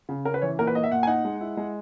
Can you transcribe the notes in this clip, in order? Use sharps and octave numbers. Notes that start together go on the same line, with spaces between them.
C#3
C#4 A#4
B4
E3 C#5
A#2 A#4
B4
A#3 D#5
E5
A#2 F#5
G#5
D#4 F#5
G#3
E4
G#3